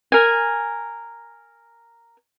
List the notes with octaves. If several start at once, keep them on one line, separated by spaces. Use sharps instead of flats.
A#4 G#5